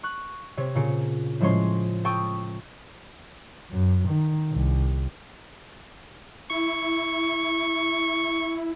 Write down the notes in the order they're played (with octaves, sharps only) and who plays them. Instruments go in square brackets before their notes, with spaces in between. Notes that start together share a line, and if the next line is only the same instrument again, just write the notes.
[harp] C#6 F#6
C3 C#5
A#2 C#3 C#7
A2 F3 G#3 C#4 C#5 C6
A4 G5 C#6 D#6
[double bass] F#2
D#3
C2
[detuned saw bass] E4 [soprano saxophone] C#6